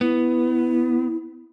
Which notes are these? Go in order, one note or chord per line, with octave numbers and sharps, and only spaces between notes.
B3 E4